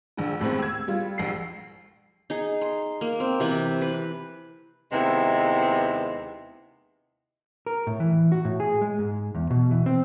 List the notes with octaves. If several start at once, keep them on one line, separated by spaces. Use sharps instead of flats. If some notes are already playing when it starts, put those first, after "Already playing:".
A#1 D3
D#2 A2 G#3 C4
E6 G#6
G3 F4
A#1 C7
D#4 G#4
C6
A#3
C4
C3 E3 B4
B4
D#2 C3 G#3 B3 E4
A#4
A2
E3
F#4
A2
G#4
G#3
G#2
E2
B2
E3
C4